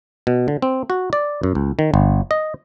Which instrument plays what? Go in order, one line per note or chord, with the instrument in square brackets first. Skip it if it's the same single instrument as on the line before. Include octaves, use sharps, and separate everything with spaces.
[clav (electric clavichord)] B2
D3
C4
F#4
D5
F#2
C#2
D#3
G1
D#5